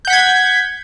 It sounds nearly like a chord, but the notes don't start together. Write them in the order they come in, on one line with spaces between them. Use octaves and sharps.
G6 F#5 B6 G#6